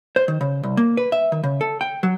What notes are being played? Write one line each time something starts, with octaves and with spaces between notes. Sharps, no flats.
C5
D#3
C#3
C2
A#3
B4
E5
D#3
C#3
A4
G5
F#3